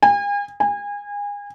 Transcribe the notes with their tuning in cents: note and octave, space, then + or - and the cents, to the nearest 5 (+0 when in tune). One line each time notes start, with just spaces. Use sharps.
G#5 -40
G#5 -30